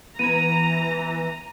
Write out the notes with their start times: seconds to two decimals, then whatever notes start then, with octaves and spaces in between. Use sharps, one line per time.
0.19 E3 B3 A#5 B5 G#6 D#7